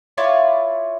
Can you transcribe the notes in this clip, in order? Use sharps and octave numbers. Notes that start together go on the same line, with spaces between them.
E4 F4 C#5 D5